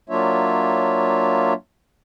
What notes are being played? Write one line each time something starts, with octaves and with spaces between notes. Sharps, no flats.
F#3 A#3 D4 F4 C#5 E5